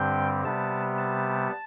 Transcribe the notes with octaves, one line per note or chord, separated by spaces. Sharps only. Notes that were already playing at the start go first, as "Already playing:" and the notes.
Already playing: G2 D3 G3 C4 G5
C3 G3 B3 A5
A5